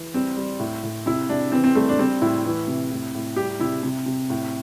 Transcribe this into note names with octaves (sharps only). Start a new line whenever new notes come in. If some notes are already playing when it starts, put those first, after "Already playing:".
Already playing: E3
G3 C4
G3
A2
A2
C3 E4
C3 D4
E3 C4
C4
G3 A3
D4
G3 C4
A2 E4
E3 E4
C3
A2
A2
G3 G4
C3 E4
C3
C3
A2